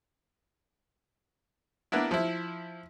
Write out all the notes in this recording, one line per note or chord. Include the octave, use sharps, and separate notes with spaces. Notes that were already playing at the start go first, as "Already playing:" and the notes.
A#3 B3 D4 E4
F3 E4